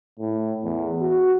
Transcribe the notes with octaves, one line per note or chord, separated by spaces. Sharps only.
A2
E2
F#4